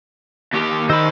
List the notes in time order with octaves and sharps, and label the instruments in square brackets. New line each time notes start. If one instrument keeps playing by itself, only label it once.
[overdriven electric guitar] D#2 G4
[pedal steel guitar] D#3 D#5 E6 [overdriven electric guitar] C5 B5